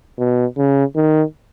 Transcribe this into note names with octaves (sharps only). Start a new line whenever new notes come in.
B2
C#3
D#3